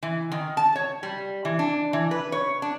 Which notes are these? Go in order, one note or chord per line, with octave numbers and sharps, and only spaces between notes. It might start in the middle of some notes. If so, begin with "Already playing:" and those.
E3
D#3
A5
C#5
G3
E3
D4
E3
B4
C#5
D4